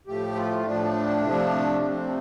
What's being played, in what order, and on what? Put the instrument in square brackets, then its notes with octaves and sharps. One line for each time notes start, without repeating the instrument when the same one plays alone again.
[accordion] A2 F3 A3 G4
F4
A2 F3 A3 D4
C3 F3 A3
C3 F3 A3 C4